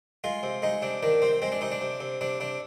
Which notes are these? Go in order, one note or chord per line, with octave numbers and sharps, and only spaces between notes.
G#3 F4
C3
G#3 D#4
C3 D4
D#3 D4
C3 C4
G#3 C4
D4
C3 D#4
D4
C3
C3
C3 D4
C3 D4